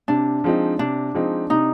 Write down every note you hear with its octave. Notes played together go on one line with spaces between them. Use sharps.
C3 D4
F3 G#3 C4 D#4
C3 D4
F3 G#3 C4 D#4
C3 D#4